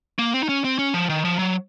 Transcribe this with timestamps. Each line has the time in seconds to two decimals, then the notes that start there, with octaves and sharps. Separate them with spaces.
0.19 A#3
0.34 C4
0.43 D#4
0.49 C#4
0.64 C4
0.79 C#4
0.94 F3
1.09 D#3
1.25 F3
1.39 F#3